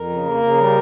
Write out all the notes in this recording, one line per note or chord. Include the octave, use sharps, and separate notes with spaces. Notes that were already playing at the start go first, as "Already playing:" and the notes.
Already playing: F2 A#4
C#3
A#3
C#3
G3